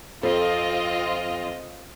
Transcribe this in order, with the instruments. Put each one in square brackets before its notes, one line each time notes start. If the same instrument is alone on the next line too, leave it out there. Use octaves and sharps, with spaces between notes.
[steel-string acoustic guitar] F2 [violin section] C4 F4 D#5